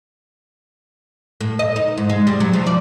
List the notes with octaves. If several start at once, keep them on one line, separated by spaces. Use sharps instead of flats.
A2
D#5
D#4
G#2
G#3
G3
F#3
F3
D5